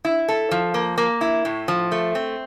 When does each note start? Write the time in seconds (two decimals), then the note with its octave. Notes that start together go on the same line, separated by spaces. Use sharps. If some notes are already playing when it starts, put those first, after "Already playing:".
0.05 E4
0.28 A4
0.51 F3
0.74 A#3
0.98 A#3
1.21 E4
1.45 A2
1.68 F3
1.92 A3
2.15 C4